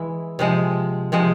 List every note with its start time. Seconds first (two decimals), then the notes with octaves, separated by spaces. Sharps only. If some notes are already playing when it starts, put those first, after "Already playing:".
Already playing: E3 G#3 E4
0.39 C3 F3 G#3
1.12 C3 F3 G#3